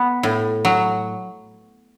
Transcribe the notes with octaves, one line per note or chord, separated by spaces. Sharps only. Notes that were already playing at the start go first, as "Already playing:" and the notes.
Already playing: B3
A2
F#3